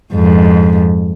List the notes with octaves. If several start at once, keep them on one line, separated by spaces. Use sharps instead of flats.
F2 G#2